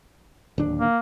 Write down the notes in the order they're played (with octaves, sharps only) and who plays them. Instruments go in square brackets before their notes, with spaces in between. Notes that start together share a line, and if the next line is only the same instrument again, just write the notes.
[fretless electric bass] D1 D#2 D4
[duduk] A#3